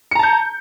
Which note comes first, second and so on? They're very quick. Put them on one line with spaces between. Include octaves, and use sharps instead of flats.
C#7 A#5 A5 G6